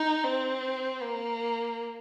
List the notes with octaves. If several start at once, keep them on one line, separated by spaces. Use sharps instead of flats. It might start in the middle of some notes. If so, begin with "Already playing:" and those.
Already playing: D#4
C4
A#3